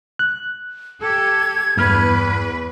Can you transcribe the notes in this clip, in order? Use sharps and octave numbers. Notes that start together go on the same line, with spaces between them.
F#6
G4 A4 G#6
E2 G2 B4 F6